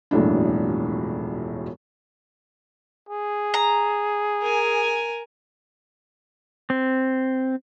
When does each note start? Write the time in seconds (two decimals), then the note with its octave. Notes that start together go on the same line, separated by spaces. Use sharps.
0.11 E1 A#1 F#2 A2 D4
3.09 G#4
3.54 A#5
4.42 A#4 G#5
6.70 C4